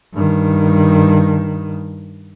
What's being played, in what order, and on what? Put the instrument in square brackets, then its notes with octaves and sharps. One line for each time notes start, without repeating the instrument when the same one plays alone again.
[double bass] G2 D#3